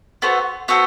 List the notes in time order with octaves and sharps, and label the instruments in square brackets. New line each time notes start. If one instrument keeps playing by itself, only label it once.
[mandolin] B3 F#4 A4 C5
B3 F#4 A4 C5